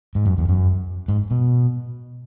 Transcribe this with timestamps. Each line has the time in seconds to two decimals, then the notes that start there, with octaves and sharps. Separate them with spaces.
0.15 G#2
0.26 F#2
0.38 E2
0.48 F#2
1.08 G#2
1.31 B2